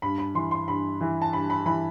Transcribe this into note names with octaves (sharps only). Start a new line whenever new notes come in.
G2 B5
B5
E3 C6
C6
G2 B5
E3
A5
G2 B5
B5
E3 B5